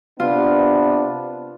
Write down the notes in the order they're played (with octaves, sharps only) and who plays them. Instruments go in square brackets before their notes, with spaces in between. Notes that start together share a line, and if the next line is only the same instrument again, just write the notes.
[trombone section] C3 B3 D4 [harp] F4